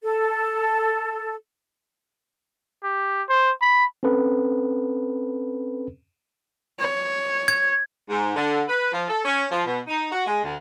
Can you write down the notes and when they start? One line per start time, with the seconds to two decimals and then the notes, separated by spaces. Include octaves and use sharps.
0.03 A4
2.84 G4
3.29 C5
3.61 B5
4.03 C4 C#4 A4 B4
6.79 C#5
7.48 G#6
8.10 G#2
8.36 D3
8.68 B4
8.92 F3
9.08 A4
9.25 C#4
9.51 F3
9.66 B2
9.88 D#4
10.12 F#4
10.27 G#3
10.43 D2